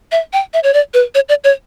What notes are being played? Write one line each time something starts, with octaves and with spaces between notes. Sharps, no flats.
E5
G5
E5
C#5
D5
B4
C#5
D5
C#5